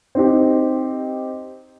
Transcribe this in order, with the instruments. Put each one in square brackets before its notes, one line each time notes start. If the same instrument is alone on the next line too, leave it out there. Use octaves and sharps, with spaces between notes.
[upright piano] C4 D#4 G4